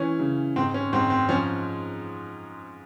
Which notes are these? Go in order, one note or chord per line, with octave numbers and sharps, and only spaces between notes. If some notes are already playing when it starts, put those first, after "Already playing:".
Already playing: E3 C#4
C#3
G#2 C4
C#4
G#2 C4
C4
F3 C#4